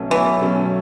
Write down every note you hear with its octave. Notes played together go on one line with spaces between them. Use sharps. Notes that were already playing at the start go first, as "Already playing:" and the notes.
Already playing: B1 B2 F#3 A3 C#4
B1 E3
B2 F#3 A3 C#4